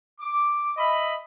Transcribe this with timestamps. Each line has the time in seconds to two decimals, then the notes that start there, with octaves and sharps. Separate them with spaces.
0.20 D6
0.77 D#5 E5 B5